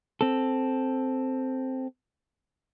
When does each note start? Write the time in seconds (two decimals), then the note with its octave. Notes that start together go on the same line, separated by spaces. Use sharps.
0.21 C4 A4